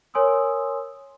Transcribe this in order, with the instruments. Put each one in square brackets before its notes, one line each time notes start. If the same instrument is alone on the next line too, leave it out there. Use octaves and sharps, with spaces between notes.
[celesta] A#4 C#5 G#5 C6 D#6 E6